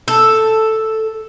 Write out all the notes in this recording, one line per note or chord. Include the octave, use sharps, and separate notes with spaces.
A4